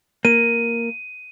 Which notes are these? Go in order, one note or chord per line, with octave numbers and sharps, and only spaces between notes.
A#3 D#7